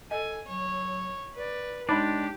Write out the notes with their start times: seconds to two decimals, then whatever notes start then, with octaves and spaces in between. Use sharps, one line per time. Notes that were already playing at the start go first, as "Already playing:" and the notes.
0.11 A4 D#5 G#5
0.47 F#3 C#5
1.35 B4 D5
1.89 G#3 D4 D#4 G4 C#5 B5